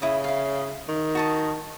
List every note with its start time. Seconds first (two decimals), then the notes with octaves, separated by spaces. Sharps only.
0.02 C#3 E4 D#6
0.24 E4 F5
0.89 D#3
1.15 F#4 A5 D#6